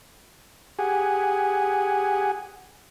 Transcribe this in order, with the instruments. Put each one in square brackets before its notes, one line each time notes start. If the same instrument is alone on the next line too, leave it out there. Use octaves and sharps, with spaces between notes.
[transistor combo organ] G4 G#4 F#5 G#5